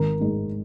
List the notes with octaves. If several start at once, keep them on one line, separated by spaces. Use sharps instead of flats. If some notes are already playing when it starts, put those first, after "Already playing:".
Already playing: G#1 A#4
G#2 G#3